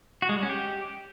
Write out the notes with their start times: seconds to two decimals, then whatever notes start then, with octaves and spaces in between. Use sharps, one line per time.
0.22 F#4
0.29 G#3
0.36 G3
0.43 C#4
0.50 G4